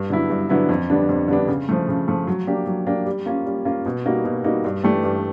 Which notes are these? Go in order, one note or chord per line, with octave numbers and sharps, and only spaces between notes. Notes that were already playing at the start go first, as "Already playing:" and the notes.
Already playing: G2
D3 F#3 B3 E4
G2
D3 F#3 B3 E4
F2
D3 G3 B3 D4
F2
D3 G3 B3 D4
C#3
F3 A3
C#3
F3 A3
F#3
A#3 D4 G4
F#3
A#3 D4 G4
G3
A#3 C#4 F4
G3
A#3 C#4 F4
B2
G3 A#3 D#4 F#4
B2
G3 A#3 D#4 F#4
G2
E3 A3 D4 G4
G2